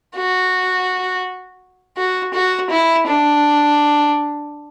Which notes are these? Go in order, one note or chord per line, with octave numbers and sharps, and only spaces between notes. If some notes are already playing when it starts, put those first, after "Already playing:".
F#4
F#4
F#4
E4
D4